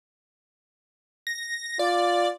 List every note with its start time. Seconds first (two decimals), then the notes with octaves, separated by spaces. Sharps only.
1.27 A#6
1.79 F4 D5